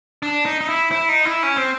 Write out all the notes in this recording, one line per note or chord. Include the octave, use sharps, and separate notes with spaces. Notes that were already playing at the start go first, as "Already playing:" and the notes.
D4
D#4
D#4
E4
E4
D#4
E4
C#4
C4